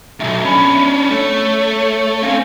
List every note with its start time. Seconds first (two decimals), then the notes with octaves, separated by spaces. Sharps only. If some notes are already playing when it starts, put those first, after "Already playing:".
0.20 B1 G2 E5
0.45 C#4 D4 B5
1.11 A3 C#5
2.22 C4 C#4 F5